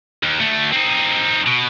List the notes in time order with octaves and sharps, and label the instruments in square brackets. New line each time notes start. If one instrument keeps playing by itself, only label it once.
[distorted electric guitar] D#2
D2 A3
C4 D#4
B2